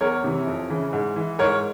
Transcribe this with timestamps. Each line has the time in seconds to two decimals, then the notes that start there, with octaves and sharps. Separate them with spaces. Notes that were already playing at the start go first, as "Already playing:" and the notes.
0.01 E2 A#4 C#5
0.24 C3 E3
0.47 F2
0.70 C#3 E3
0.93 G#2
1.16 E3
1.39 G#2 A#4 C#5